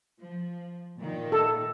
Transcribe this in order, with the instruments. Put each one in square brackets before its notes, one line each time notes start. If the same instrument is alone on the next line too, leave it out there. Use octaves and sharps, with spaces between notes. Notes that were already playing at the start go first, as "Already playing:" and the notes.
[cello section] F3
A#2 D#3
[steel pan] A4